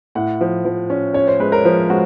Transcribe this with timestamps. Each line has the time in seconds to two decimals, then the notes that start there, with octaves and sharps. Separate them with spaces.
0.15 A2 F#5
0.41 F3
0.65 F3
0.90 C#4
1.14 C#4 C#5
1.28 C5
1.39 G#3 B4
1.52 A#4
1.65 F3
1.90 G#3 F#4